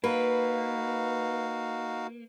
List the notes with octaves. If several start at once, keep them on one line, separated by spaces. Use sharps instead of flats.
A#3 D#4 F#4 B4 F5